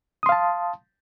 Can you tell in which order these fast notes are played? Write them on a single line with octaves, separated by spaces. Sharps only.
D#6 C6 F5 A5